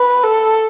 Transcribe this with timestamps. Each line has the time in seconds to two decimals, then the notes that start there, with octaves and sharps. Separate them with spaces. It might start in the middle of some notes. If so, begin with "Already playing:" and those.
Already playing: B4
0.24 A4